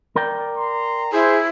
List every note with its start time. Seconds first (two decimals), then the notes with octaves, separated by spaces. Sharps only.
0.16 A#4 D5 G5
0.58 A#5 C6
1.13 E4 G#4 C5